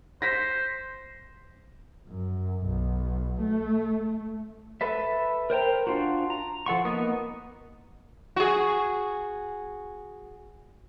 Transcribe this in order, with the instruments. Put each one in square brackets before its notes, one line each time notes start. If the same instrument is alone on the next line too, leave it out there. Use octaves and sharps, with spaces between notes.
[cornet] C5 [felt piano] A#6 B6
[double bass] F#2
B1
A3
[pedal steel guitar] A4 B4 E5
A#4 C5 G5 A#5
D4 F4 F#4
A#5
F3 A4 F#5 C#6
A#3 B3 D#4 D#6
[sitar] F#4 G#4